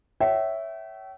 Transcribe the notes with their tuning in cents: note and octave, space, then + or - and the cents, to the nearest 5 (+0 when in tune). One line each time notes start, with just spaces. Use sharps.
C#5 +0 E5 -5 G5 -40